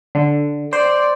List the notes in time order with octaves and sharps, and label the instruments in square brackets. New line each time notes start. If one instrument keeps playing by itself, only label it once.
[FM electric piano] D3
[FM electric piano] C5 [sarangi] D5